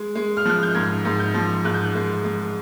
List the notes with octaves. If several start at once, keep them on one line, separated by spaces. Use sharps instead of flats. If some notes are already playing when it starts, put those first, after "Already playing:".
Already playing: G#3
G#3
F6
F3 F#6
G6
G#2 G#6
G#2
G6
F3
G#2 F#6
G6
F#6
G#3
G#3